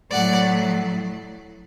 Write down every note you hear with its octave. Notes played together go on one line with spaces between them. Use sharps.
A2 F#3 D5 F#5